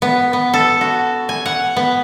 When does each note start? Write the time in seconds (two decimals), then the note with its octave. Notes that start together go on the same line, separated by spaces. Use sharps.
0.02 B3
0.33 B3
0.54 A4
0.81 F#4
1.29 G#5
1.46 F#5
1.76 B3